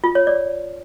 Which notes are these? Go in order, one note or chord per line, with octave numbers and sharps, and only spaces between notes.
F4
C#5
D5